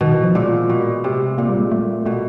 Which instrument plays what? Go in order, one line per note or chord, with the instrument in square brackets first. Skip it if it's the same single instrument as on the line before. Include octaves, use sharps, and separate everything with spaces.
[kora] B2 [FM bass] D#3
[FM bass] E3
F3
[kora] A#2 [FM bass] G#3
[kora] B2
C3
[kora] A#2 [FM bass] A#3
[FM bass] G3
G#3
A3
[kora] B2 [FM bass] A3